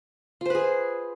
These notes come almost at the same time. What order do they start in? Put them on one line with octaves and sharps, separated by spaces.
F4 C5 B4 G#4